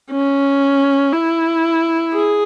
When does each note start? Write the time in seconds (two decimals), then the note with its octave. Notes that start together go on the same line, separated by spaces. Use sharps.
0.11 C#4
1.13 E4
2.14 G#4